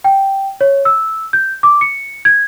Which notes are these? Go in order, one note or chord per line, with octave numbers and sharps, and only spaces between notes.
G5
C#5
E6
G6
D6
C#7
G#6